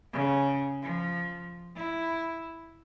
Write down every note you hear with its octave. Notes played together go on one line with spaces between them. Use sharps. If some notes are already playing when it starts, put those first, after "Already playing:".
C#3
F3
E4